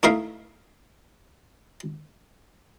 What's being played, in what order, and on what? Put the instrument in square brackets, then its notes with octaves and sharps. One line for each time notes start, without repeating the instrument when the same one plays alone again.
[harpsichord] A3 D#4 E4 A#4 E5 F5